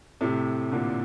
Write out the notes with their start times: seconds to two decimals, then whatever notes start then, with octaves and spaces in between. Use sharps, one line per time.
0.21 A2 C3
0.72 A#2 D3